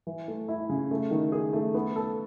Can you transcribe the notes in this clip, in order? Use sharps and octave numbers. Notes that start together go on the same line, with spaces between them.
E3
A3
E4
C#3
A3
D#3
G#4
A3
B3
A4